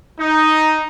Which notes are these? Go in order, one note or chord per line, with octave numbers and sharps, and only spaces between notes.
D#4